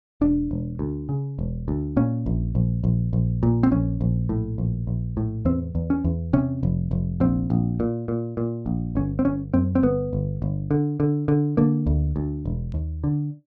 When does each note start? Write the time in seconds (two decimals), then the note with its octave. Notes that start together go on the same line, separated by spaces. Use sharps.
0.21 E1 D4
0.51 E1
0.79 D2
1.09 C#3
1.39 E1
1.68 D2
1.97 A#2 C#4
2.26 A#1
2.55 A#1
2.84 A#1
3.13 A#1
3.43 A#2
3.63 C4
3.71 A#1 C#4
4.01 A#1
4.29 A2
4.58 A#1
4.87 A#1
5.17 A2
5.45 E2 C4
5.75 E2
5.90 C#4
6.04 E2
6.33 C3 C#4
6.63 F1
6.91 F1
7.20 A#1 C4
7.50 A#1
7.80 A#2
8.08 A#2
8.37 A#2
8.66 A#1
8.95 G1 C#4
9.19 C4
9.25 G1 C#4
9.54 F#2 C4
9.75 C4
9.83 G1 B3
10.13 G1
10.42 G1
10.71 D3
11.00 D3
11.28 D3
11.57 D3 A#3
11.86 D2
12.16 D2
12.45 E1
12.74 D#2
13.04 D3